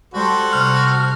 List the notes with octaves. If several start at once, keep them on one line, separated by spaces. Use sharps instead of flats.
G3 F#4 A4 C5
C3 F6